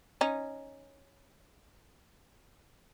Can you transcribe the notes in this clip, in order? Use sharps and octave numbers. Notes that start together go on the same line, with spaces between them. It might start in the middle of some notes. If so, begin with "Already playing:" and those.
C#4 D#4